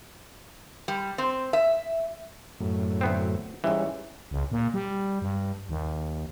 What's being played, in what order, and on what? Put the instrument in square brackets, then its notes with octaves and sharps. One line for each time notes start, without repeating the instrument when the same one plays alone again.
[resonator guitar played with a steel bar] G3
C4
E5
[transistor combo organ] F#2 A2
[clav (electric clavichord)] D2 B3 C4
[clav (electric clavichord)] G#2 E3 [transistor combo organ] G3 C#4
[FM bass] C#2
A#2
G3
G2
D#2